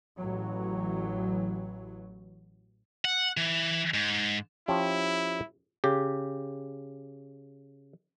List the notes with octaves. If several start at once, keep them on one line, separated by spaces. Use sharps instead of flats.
A1 E3 F#3
F#5
E3
G#2
F3 C#4 E4 G4
C#3 G4